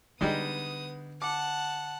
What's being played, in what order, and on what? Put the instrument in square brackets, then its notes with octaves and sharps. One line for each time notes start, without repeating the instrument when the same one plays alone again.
[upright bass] D3 D4 [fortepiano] G3 G#3 D#4 [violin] B3 D#6
[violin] F#5 A5 [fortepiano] D6